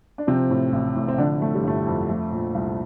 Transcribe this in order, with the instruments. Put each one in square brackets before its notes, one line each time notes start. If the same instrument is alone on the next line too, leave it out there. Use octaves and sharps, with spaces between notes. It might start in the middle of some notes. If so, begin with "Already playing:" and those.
[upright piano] D4
C3 F3 C4
A2
A1
A2
C4
D3 F3 D4
F3 A3
G3
G1 A3
F2
F3 A3
A#2
C2